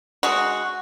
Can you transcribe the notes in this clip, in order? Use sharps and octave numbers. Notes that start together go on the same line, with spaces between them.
G#3 F#4